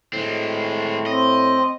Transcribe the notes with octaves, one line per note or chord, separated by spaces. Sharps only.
A2 G#3 C4
C4 D#5